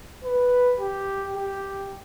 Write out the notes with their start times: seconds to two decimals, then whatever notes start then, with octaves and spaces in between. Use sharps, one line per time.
0.23 B4
0.79 G4
1.35 G4